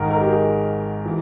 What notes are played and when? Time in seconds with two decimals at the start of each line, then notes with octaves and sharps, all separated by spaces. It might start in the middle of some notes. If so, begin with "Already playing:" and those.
Already playing: G#1 G#2 D#3 A#4
0.11 A#4
0.21 G4
0.29 G#4
1.05 E3